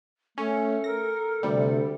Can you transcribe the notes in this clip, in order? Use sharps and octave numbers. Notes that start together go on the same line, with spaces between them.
A3 C#4 A4
A#4 A#6
D2 C3 G3